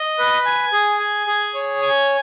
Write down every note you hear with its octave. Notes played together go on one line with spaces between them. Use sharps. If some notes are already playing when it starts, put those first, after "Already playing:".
Already playing: D#5
B4
G#5
G#4
G#5
G#4
C#5
G#5